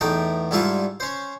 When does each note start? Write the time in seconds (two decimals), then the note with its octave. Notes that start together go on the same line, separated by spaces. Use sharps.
0.01 E2 A2 D#4 G5 A5
0.51 G#2 G3 E4 F4 A4 A5
1.00 C#4 C5